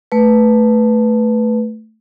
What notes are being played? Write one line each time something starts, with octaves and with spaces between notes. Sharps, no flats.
A3 B4